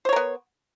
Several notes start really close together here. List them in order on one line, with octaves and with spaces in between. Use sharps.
C5 C#5 A#4 B3